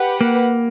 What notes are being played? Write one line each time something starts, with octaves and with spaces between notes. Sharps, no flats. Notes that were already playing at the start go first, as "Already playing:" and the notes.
Already playing: G4 B4 F#5
A#3